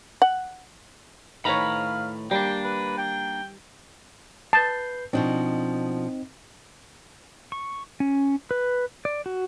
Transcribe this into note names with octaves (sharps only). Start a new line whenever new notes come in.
F#5
A2 D#3 B4 C#5 F5 A#5 B5
G3 A#3 D4 G5
B4
G5
B4 A5 G6 C7
B2 F3 C4 D4 D#4 D#5
C#6
C#4
B4
D5
F#4